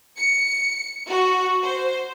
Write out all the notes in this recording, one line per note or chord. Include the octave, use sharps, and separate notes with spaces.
C#7
F#4
C5